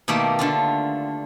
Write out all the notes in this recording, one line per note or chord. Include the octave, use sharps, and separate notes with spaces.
B2 D#3 A3 A#3 G4
D3 A3 F4